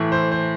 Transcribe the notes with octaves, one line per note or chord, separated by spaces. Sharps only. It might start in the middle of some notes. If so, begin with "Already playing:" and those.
Already playing: A2 E3
C5
C5